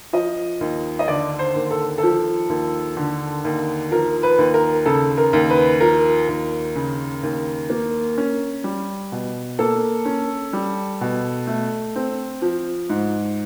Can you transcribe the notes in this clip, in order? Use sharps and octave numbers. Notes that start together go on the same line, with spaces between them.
F3 D#5
D#2
D#5
D3 D5
C5
D#2
A4
F3 A4
D#2
D3
D#2
F3 A#4
B4
D#2
A#4
C#3 A4
A#4
D#2
B4
F3 A#4
D#2
C#3
D#2
A#3
C#4
G3
B2
A#3 A4
C#4
G3
B2
A3
C4
F3
G#2